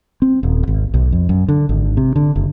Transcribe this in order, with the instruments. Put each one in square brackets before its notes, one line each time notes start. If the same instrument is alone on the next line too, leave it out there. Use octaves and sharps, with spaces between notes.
[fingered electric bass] C4
D#1
G#1
B1
F2
F#2
D3
G#1
C3
D3
F#1